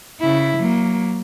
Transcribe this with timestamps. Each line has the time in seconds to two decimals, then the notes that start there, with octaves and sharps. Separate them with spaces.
0.20 C#3 E4
0.57 F#3 A#3